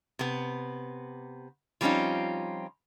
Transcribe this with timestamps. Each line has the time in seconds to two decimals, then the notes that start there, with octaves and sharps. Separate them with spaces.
0.19 C3 B3
1.81 F3 G3 C4 C#4 D#4 F4